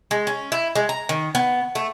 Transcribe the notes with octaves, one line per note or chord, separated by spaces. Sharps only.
G#3
C#4
E4
G#3
A#5
D#3
B3
A3